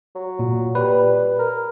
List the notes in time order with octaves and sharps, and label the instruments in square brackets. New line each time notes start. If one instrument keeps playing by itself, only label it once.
[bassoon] F#3
[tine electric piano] A#2
[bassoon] G3 [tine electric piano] B4
[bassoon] A#4